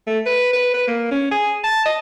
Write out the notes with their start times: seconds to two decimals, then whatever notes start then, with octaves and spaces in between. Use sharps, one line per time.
0.07 A3
0.26 B4
0.53 B4
0.74 B4
0.88 A#3
1.11 C#4
1.31 G#4
1.64 A5
1.85 D#5